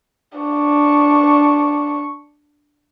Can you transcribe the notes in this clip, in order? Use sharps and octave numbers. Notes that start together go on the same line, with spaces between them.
D4 C#6